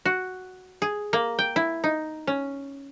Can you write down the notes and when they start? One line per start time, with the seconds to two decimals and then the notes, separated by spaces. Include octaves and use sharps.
0.05 F#4
0.82 G#4
1.13 A#3
1.39 G5
1.56 E4
1.84 D#4
2.27 C#4